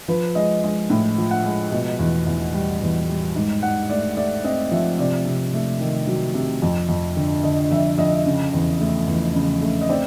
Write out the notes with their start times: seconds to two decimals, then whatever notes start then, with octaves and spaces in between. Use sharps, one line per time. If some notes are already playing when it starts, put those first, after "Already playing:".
0.08 F3 B4
0.35 G#3 D#5
0.63 G#3 D#5
0.90 A2
1.18 F3
1.31 F#5
1.44 G#3
1.72 B2
1.99 E2
2.26 E2
2.54 G3
2.81 E2
3.08 G3
3.35 G#2
3.63 G#2 F#5
3.90 A3 D5
4.16 A3 D5
4.44 C4 D#5
4.71 F3 E5
4.99 C3 D5
5.25 C3
5.54 A3
5.80 D#3
6.07 F#3
6.34 C3
6.62 F2
6.89 F2
7.16 D3
7.43 D3 D#5
7.71 F2 E5
7.98 F2 D#5
8.26 C#3
8.53 E2
8.80 A3
9.07 E2
9.35 C#3
9.61 A3
9.81 D#5
9.89 C4 D5